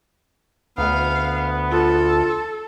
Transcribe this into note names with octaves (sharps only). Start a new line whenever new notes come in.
D2 B3 F5
F4 A4